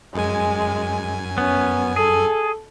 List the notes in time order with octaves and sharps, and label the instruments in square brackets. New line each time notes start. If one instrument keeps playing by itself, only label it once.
[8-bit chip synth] F#2 G#5 [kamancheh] G#3
[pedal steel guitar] B3 [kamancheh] C#4
[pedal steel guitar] G#4 [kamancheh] A4